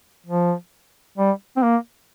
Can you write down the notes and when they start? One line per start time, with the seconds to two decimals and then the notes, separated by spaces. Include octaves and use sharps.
0.26 F3
1.18 G3
1.57 C4
1.63 A#3